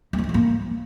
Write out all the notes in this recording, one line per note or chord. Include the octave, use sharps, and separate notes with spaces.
A#3
F#3
E3
A2
A#3